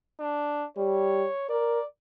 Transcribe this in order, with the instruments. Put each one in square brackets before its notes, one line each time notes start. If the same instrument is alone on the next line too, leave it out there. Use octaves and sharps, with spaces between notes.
[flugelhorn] D4
[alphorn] G3 [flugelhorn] C#5
[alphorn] A#4 [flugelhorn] D5